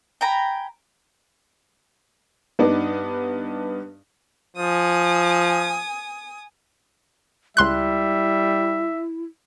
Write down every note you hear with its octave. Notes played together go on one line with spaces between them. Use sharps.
G5 G#5 A#5 B5
G2 B3 D4 D#4
F3 G#5 D#6
C#2 G3 E4 E5 C6 F#6